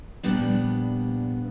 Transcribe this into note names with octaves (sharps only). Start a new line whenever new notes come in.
A#2 F3 G3 B3 D4